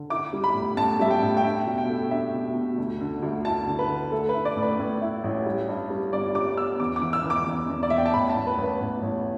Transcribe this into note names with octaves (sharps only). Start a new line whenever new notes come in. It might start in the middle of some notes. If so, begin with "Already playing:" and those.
Already playing: D3
E4 D6
G3
B5
A2
A2 A5
G3 E5
G5
A2
G5
D4 E5
B2
G5
A3
D4 E5
B2
B2
D2
D3
D2
E4 A5
D3
B4
D3
A3 A4
B4
E4
D5
A2
B4
A2
E4
A1
G3
G2
G3
G1 D5
G3 D6
B3 E6
E2 D6
D6
E3
E6
E3
D6
E2
E2
D5
E2 E5
G5
A5
A1 B5
A5
A1
B4
A1
B4
A1
A1